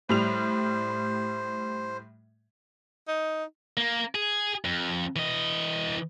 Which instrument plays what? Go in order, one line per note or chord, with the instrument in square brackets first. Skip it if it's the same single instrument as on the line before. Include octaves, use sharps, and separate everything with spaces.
[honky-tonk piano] A2 G3 F7 [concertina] C5
[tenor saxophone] D#4
[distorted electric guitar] A#3
G#4
F2
E3 D#5